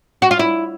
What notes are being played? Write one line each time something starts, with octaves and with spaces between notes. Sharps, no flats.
F#4
F4
E4